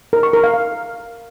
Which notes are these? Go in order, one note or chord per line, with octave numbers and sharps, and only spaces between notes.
A#4
C#6
A#4
F5
F5